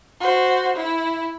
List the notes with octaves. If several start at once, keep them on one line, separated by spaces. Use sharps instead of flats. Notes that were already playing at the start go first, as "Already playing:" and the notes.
F#4 C5
E4